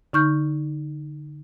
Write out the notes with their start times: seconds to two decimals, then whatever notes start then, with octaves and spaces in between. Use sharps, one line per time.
0.13 D3 D#4 C#6 F6 G6